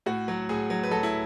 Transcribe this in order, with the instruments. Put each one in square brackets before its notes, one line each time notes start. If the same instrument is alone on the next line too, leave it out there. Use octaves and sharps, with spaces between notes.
[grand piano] A2 F#4
F#3
A2 G#4
F#3
B4
F#3 A4
E4